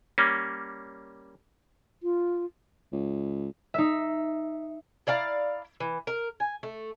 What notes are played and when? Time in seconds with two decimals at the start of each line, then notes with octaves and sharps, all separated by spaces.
0.18 G3 A#3 C#4
2.03 F4
2.93 C#2
3.74 D#4 E5
5.07 E4 D5 F5 A#5
5.80 E3
6.07 A#4
6.40 G#5
6.63 A3